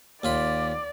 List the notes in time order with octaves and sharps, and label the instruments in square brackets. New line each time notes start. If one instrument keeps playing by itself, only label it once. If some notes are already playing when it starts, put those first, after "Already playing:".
[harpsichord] D#2 F4 B5 [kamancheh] D5